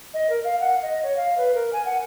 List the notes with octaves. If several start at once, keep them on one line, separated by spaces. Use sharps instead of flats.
D#5
A#4
F5
F#5
D#5
C#5
F5
B4
A#4
G#5
F#5